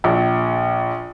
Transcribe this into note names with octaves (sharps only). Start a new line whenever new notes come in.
A#1